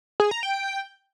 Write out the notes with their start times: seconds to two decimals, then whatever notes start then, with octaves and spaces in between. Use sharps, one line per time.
0.20 G#4
0.31 A#5
0.43 G5